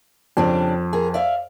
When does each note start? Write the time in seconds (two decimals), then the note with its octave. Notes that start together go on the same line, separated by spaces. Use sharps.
0.37 F2 C#3 G3 D4
0.93 G#4 A#4
1.14 D5 E5 F5